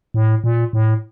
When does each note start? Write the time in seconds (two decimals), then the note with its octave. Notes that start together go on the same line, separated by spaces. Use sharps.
0.14 A2
0.44 A#2
0.73 A2